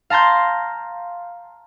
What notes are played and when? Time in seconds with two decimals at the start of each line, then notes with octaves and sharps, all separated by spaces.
0.10 F5 A5 A#5 C6 G6